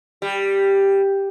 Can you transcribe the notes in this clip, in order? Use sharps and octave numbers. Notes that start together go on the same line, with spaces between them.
G3